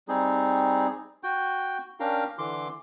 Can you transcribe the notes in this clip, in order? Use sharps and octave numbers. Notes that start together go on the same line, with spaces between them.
G3 C4 D#4 G#4
F#4 G5 G6
C#4 D4 A#4 F5 G5 A#5
D3 E3 C6 D6